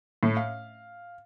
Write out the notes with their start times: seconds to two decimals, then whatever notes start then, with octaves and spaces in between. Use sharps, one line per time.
0.23 A2
0.37 F5